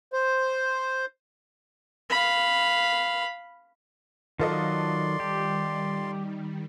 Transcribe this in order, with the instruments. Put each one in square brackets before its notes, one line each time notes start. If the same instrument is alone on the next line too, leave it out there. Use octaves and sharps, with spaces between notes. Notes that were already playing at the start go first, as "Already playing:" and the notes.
[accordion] C5
[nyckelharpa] F5 B5
[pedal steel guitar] D#3 F#3 [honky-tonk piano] F4 A4 D#5 [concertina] D5 C6
[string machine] D#3 G3 [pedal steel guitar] G4